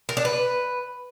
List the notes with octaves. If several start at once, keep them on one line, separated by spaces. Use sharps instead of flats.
A#4
D4
B4